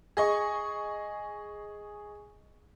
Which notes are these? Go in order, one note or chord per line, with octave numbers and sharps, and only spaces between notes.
G#4 D#5 C#6